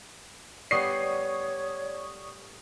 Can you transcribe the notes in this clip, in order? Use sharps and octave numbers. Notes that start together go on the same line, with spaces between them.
A2 G3 B3 C#5 D5 C#6 D#6 C7